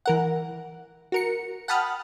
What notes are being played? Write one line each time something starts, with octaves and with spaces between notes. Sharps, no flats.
E3 A#4 F#5
F#4 A#4 C#7
F#5 G5 A5 B5 D#6 F6